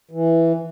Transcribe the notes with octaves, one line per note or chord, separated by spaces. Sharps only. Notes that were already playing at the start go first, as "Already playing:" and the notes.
E3